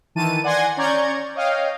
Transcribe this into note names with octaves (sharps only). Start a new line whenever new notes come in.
D#3 E3 A5 D#7
D5 F#5 G#5 C6 G#6 A#6
C#4 D5 A#5 C#6 G6 G#6
C#5 D#5 F5 G5